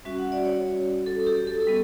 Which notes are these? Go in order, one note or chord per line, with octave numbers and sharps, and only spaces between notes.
G3 C#4 F#4 E5
F#5
D5
C#5
A4
G4
A4
G3 B3